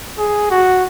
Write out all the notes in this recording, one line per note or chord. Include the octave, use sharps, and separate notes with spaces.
G#4
F#4